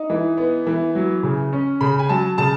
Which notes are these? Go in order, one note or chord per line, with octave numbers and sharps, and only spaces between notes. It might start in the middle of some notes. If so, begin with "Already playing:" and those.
Already playing: D#4
E3
B3
E3
F#3
C#3
C#4
C#3 B5
G#5
F#3 A5
C#3 A5